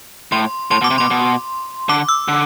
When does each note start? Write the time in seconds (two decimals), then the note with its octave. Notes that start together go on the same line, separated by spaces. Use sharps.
0.32 A2 C6
0.71 A2 C6
0.81 B2
0.84 D6
0.90 C3
0.98 B2 C6
1.11 B2
1.89 D3 D6
2.09 E6
2.28 D3